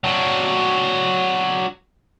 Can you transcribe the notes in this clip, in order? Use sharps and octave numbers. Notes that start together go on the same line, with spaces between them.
F#3 D4